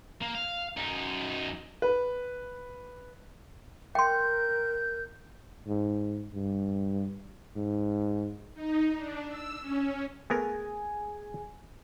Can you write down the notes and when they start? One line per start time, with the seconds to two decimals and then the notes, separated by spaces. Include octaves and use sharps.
0.22 A#3
0.35 F5
0.77 F#2 D#4
1.82 B4
3.95 A#4 G5 C6 G6
5.68 G#2
6.34 G2
7.56 G#2
8.54 D#4
8.97 D4
9.29 E6
9.60 C#4
10.30 A3 B3 G#4 A#4 G#5